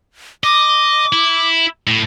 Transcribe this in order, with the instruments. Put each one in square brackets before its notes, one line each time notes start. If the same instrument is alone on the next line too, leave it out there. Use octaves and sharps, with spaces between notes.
[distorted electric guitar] D#5 [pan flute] D6
[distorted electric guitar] E4
A2